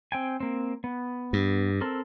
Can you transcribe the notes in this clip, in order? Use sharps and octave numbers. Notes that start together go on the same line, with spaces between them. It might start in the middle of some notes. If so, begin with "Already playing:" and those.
C4 G5 G#5
A#3 C4
B3
G2
C4 A4 A#4